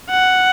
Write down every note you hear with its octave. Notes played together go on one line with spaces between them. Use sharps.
F#5